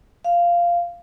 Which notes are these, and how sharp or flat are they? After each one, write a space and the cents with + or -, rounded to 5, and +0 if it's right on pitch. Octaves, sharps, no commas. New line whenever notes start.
F5 -10